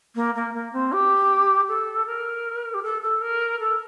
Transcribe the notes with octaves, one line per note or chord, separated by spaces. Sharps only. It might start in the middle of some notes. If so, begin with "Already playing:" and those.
A#3
A#3
A#3
C4
G4
A4
A#4
G4
A4
A4
A#4
A4